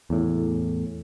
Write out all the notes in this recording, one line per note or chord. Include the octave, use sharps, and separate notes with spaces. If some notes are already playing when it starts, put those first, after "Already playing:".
E2 A2